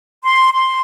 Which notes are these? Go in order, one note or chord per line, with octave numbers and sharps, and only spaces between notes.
C6
C6